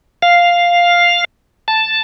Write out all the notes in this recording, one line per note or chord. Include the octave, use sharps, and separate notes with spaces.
F5
A5